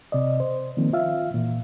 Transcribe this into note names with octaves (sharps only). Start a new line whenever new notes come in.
C3 D5 D#5
C5
D#3 F3 A#3 C4
F4 E5 F5
A#2 E3